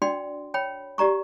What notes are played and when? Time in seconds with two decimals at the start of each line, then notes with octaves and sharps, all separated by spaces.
0.02 D4 F#4 D5 G5 C6
0.54 C#5 G5 B5
0.98 G4 D5 A#5 C#6